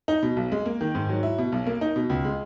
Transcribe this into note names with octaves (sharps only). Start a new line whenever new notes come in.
D#4
B2
B1
G#3
A#3
D#3
G#2
F#3
E4
B2
B1
A#3
D#4
B2
C#2
G#3